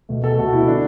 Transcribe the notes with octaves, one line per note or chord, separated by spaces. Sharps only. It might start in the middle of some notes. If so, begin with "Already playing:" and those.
B2 A3
A4
B2 A3 F#4
E4
D3 A3 D4